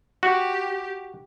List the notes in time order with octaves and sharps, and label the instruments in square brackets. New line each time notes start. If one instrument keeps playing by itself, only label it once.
[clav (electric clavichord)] F#4 [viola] G4